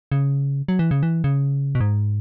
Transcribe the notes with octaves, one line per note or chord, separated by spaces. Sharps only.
C#3
F#3
E3
C#3
E3
C#3
B2
G#2